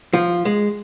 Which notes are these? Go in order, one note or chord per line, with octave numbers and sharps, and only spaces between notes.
F3
G#3